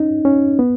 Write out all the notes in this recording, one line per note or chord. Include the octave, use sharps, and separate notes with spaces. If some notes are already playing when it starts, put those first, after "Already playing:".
Already playing: C#4 D#4
C#4
B3